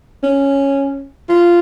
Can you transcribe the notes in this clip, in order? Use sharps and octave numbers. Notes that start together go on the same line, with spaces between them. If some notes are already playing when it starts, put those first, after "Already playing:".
C#4
F4